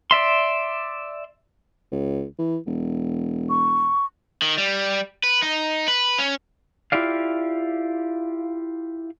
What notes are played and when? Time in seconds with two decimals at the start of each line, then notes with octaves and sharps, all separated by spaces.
0.11 D5 E5 C6
1.92 C#2
2.39 E3
2.67 E1
3.50 C#6
4.42 D#3
4.58 G3
5.23 B4
5.43 D#4
5.88 B4
6.19 C#4
6.92 E4 F4 G4 D5 F5